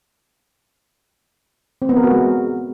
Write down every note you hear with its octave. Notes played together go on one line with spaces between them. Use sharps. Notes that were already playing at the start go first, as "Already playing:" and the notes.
C4
B3
A#4
F#4
G#3